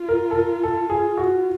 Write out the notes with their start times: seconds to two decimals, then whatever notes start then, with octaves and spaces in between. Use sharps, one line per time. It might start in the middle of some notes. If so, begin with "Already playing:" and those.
Already playing: F4
0.09 A#4
0.31 A4
0.35 A#4
0.63 A4
0.90 G#4
1.17 F#4